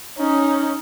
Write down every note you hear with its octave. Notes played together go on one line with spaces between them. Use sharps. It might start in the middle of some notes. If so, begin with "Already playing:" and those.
C#4 D#4